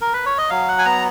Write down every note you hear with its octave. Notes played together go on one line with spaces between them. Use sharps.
A#4
B4
C#5
D#5
F#3 F5
F#5
G#5
B3 A#5